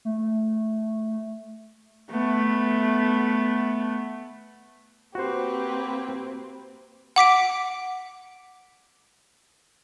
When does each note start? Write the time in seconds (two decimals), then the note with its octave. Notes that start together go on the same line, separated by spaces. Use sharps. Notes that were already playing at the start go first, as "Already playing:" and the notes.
0.05 A3
2.11 A3 B3
5.15 A#3 C4 F#4 G4 B4 C5
7.16 F#5 D6 B6 D7